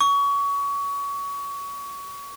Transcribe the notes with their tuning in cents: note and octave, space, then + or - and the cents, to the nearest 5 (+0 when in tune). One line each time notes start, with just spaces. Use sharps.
C#6 +25